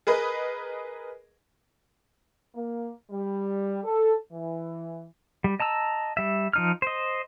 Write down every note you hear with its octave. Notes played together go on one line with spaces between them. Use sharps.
G#4 A#4 B4 D#5
A#3
G3
A4
E3
G3
D#5 A5 A#5 E6
G3 E5
F3 D#4 F6
C5 D#5